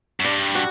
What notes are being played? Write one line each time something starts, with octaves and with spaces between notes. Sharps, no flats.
F#2
G2 G3
F#4